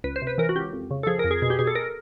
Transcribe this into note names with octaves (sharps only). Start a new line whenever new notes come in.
C#2 B4
C5
C3
B4
E3 A#4
F#4
C#2 G4
F2
C#3
A4
F3 G#4
A#4
F2
G#4
B2 G#4
G4
B2 G#4
A4
A#4